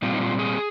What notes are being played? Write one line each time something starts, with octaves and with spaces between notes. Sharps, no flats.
A#2 G3 C4 F4
D#4
F4
G#4